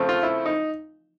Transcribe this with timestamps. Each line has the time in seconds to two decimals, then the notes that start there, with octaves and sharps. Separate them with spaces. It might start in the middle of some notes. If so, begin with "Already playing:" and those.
Already playing: C#3 F3 A3 C4
0.09 F4
0.23 E4
0.46 D#4